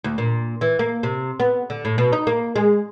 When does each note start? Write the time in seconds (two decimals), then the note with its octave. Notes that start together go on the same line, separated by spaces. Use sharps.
0.04 D2
0.18 A#2
0.61 E3
0.79 A#3
1.03 C3
1.40 B3
1.70 D3
1.85 A2
1.98 B2
2.12 D#4
2.27 A#3
2.56 G#3